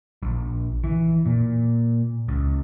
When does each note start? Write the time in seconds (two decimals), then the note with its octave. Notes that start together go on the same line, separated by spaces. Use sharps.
0.23 A#1
0.84 E3
1.26 A#2
2.28 C#2